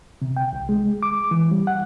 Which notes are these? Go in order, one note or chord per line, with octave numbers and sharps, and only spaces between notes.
C3
G5
C2
G#3
D6
E3
G3
F#5